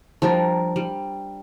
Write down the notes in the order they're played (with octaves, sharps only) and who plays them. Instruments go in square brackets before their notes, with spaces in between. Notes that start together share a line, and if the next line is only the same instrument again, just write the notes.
[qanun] F3 G3 D4 A#4
G3